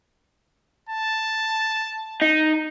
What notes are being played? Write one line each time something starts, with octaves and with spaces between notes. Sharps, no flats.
A5
D#4